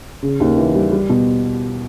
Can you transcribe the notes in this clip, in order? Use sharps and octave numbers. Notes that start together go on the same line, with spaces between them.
C#3
D#2
E3
G3
G3
B2